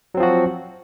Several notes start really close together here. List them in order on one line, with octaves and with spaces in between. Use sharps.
F#3 C4 F3 F#4